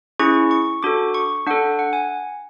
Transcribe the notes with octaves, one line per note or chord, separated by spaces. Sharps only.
C#4 E4 G#4 C#6
C#6
D4 F#4 A4 D6
C#6
D4 A4 F#5
F#5
G#5